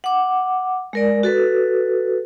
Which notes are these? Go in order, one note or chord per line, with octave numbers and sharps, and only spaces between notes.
F#5 D6
G#3 A#4 D5
F#4 A4 B4